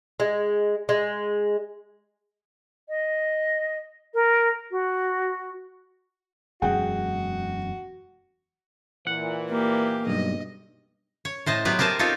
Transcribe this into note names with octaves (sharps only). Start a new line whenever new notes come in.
G#3
G#3
D#5
A#4
F#4
E1 F#2 G#3 F#4 G#4 F#5 G5
A#2 E3 F#5
A#3 G4
B1 G2 D#5
C#5
A2 C5 D#5 A5
F#3 B3 G4 B4
G4 A#4 C5 G#5 A5
C4 D#4 F4 G4 A4 C#5